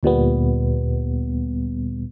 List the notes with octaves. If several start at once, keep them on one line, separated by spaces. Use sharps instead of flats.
D2 A#2 G3 B3